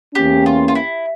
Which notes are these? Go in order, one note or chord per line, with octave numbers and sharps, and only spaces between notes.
E2 E3 A#3 C#4 G4
F4
F4
E4